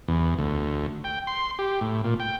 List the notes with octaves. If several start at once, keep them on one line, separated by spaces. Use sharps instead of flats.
E2
D2
G5
C6
G4
A2
A#2
G5